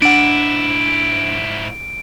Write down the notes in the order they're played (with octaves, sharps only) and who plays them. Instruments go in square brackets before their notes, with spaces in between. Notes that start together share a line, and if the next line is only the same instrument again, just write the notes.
[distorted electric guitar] G#2 E4 [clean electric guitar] D4 F#5 [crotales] D7